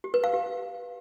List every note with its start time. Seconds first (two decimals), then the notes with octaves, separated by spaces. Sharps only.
0.04 G4
0.14 B4
0.24 F5
0.33 G4